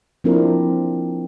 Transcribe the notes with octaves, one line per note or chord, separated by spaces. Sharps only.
F3 A#3 C4 D4 E4 A#4